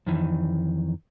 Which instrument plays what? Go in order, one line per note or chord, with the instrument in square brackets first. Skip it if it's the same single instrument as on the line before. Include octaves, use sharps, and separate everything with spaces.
[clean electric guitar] F2 D#3 E3